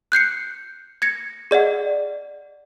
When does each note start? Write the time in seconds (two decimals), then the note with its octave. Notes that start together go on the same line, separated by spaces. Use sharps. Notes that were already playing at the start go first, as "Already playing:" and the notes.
0.12 F#6 G6 C7 C#7
1.02 G#6 A#6 C#7
1.51 G#4 D5 D#5 F#5